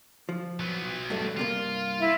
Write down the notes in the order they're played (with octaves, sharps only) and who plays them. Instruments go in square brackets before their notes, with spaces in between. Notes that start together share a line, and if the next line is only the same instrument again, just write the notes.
[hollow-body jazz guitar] F3
[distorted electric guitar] F#3 B3
[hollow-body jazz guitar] G2 A3
[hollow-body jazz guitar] G2 C3 A#3 [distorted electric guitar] F4
[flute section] E4 E5